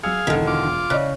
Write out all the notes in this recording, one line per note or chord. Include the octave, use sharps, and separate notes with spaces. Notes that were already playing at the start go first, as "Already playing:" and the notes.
F#3 G#4 F5 E6 C#7
E1 D3 D#3 G#6
F4 D6
C#3 D5 D#5 F#6